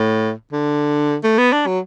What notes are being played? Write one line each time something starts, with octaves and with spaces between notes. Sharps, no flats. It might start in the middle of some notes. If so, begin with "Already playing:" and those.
Already playing: A2
D3
A3
B3
D4
F#3